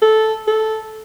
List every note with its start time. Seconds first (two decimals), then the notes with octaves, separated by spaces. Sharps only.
0.02 A4
0.47 A4